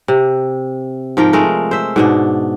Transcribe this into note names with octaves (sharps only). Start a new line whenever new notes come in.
C3
G#2 F3 A#4 G5
G#3 A3 A#4
C5 E5
G#2 B2 D4